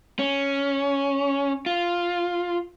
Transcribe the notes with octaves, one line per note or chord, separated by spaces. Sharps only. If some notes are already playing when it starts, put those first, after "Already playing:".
C#4
F4